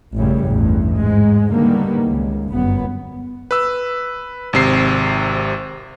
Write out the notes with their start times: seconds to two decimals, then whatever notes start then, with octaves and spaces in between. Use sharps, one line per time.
0.16 A1 F#2 A2 C#3 G3
0.48 A1 E2 G2
0.97 G#2 G#3
1.53 D3 D#3 G3 A#3 B3
2.02 C#2
2.51 G1 F#2 B3
3.51 B4 E6
4.53 G#1 C3 C7